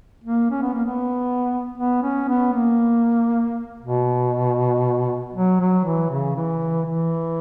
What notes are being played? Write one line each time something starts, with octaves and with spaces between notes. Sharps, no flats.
A#3
C#4
B3
A#3
B3
B3
C#4
B3
A#3
B2
F#3
F#3
E3
C#3
E3
E3